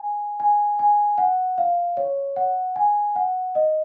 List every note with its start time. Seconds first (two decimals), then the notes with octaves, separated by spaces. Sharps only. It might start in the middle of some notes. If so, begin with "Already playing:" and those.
Already playing: G#5
0.40 G#5
0.79 G#5
1.18 F#5
1.58 F5
1.97 C#5
2.36 F#5
2.76 G#5
3.16 F#5
3.55 D#5